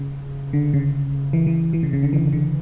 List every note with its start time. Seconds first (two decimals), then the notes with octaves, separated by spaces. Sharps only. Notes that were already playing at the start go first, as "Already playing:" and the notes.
Already playing: C#3
0.53 D3
0.74 C#3
1.33 E3
1.47 E3
1.73 E3
1.83 C#3
1.93 C#3
2.03 D3
2.13 E3
2.33 D3